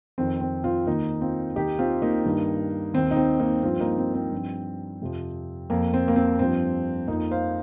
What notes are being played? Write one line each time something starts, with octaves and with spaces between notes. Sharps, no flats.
F2 D#3 C4
C4
C4 F4
D#2 D#3 A#3 D#4
C4 F4
D#2 D#3 D#4 G4
C4 F4
A#3 D#4
G2 D#3
D#2 D#3 C4
D#4
C4
A#3 D#4
G2 F3 C4 F4
A#3 D#4
C4
C4
G2 F3
F2 C3 F3
F2 F3 A#3
C4
A#3
C4
G2 F3 C4
F2 F3 A#3 D#4
C5 F5